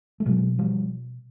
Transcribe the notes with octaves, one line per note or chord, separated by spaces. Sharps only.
A3
B2 F#3 G#3
F3 G3